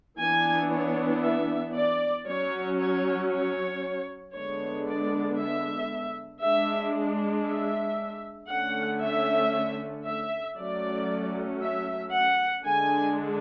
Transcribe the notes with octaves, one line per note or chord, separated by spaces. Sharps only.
E3 B3 D4 G#5
C#5
E5
D5
F#3 C#4 C#5
C#5
C#5
D3 G#3 B3 D4 C#5
D5
E5
G#3 D4 E5
E5
D3 A3 C#4 F#5
E5
E5
F#3 A3 C#4 D5
E5
F#5
D3 G#3 D4 G#5